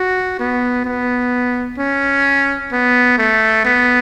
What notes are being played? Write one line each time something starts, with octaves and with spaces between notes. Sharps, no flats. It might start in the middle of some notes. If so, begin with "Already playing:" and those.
Already playing: F#4
B3
B3
C#4
B3
A3
B3